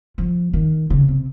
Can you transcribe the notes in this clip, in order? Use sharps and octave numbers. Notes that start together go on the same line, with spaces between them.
F3
D#3
C#3
C3